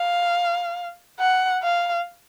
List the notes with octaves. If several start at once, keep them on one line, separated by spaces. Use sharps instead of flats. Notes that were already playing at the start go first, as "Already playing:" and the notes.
Already playing: F5
F#5
F5